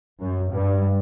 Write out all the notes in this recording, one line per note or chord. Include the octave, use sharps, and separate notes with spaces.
F#2
G2